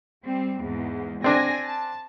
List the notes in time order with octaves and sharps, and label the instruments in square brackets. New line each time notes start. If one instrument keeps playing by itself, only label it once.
[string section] G3 C4
E2 G#2
[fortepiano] C4 D4 [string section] G#5 A#6
[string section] A5